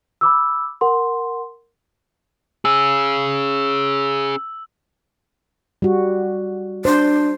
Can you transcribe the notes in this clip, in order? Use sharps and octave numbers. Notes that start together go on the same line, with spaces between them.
B5 D6 E6
A#4 F#5 C6
C#4 G#4 E6
G3 F#4
D4 C5